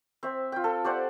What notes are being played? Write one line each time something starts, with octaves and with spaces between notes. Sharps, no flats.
C4 E5
F4 G5
A4
G4 C5 D5 F#5